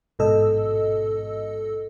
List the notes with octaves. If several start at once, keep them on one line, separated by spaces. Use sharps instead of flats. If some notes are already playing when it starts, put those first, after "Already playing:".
A1 G#2 B2 A4 D#5 E6